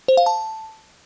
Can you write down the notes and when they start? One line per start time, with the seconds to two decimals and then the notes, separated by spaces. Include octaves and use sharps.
0.08 C5
0.17 F5
0.26 A5